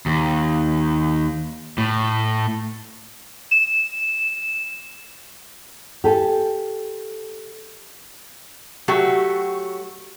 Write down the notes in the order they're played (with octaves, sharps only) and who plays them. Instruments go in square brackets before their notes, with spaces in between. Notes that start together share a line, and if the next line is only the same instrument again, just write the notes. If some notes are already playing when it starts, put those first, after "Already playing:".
[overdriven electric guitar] D#2
A2
[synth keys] E7
[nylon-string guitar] G4 A4 G#5
[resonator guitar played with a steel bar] F#3 A3 F#4 G4